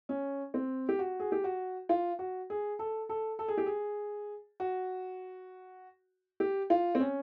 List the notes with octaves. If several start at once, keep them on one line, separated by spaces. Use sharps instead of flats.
C#4
C4
G4
F#4
G#4
G4
F#4
F4
F#4
G#4
A4
A4
A4
G#4
G4
G#4
F#4
G4
F4
C4
C#4